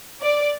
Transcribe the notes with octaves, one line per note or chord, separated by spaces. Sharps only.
D5